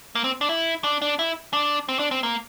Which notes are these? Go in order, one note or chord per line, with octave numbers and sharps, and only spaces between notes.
A#3
C4
D4
E4
D4
D4
E4
D4
C4
D4
C4
A#3